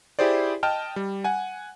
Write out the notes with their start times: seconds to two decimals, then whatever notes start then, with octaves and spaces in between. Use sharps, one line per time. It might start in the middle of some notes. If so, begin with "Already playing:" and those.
0.19 E4 G4 G#4 C5 D5
0.63 D#5 G5 A5 F6
0.96 G3
1.24 F#5 G#5